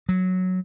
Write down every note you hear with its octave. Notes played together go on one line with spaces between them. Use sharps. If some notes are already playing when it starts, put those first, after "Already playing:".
F#3